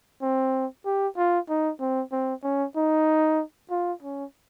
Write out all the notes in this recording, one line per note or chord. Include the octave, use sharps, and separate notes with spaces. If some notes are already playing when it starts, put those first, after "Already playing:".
C4
G4
F4
D#4
C4
C4
C#4
D#4
F4
C#4